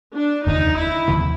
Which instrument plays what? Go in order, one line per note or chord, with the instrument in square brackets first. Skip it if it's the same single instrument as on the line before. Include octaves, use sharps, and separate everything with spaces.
[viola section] D4
[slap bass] F1 D#2 D3 F3 [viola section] D#4
[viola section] E4
[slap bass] F1 D#2 D3 F3